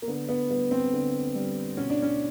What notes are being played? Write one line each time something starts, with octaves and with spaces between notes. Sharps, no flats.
A#3
D3 B3
B3
G3 B3
C4
D3
G3
B2 C#4
D4
C#4